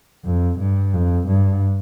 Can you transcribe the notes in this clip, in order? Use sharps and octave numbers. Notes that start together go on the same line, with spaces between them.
F2
G2
F2
G2